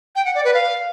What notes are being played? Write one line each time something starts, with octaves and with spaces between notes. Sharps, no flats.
G5
F#5
D5
B4
F5